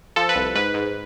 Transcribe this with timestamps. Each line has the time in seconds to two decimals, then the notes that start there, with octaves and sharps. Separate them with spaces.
0.16 F3 A4
0.29 B4
0.35 C2
0.55 G#2 B4
0.74 G#2